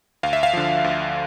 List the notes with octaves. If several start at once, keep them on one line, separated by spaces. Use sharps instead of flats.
D2 F5
E5
F5
D3 F3
D2